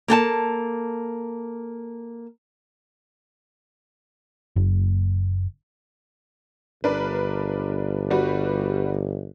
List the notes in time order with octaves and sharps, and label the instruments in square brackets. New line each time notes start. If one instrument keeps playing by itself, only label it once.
[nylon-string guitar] A#3 A4 G5 A5
[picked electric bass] F#1
[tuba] G1 [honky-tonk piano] D4 A#4 B4
[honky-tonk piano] G3 F#4 B4